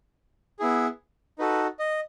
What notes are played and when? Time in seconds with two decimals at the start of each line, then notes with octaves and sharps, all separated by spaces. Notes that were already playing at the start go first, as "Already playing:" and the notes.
0.59 B3 E4 G#4
1.39 D#4 F#4 A4 B4
1.79 D#5